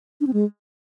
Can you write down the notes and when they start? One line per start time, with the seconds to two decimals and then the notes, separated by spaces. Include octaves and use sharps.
0.21 D4
0.27 C4
0.33 G#3